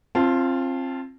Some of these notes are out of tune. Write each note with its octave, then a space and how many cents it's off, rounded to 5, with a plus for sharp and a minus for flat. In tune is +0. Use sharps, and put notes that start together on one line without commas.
C4 +25 F4 -15 A5 +0